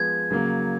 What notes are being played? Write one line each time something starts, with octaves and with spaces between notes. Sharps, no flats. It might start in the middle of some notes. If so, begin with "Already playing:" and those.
Already playing: F3 G#3 B3 G#6
C#3 F#3 A#3